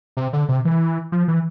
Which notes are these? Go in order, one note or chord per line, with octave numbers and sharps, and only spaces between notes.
C3
D3
C3
E3
F3
E3